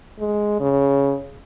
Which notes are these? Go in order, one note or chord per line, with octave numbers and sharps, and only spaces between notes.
G#3
C#3